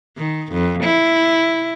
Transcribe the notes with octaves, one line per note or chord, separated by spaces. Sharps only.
D#3
F2
E4